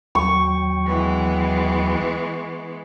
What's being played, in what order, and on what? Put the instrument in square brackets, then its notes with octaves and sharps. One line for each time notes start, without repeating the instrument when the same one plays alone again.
[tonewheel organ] D#2 F#3 G5 [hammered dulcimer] C#6
[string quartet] E3 G#3 B3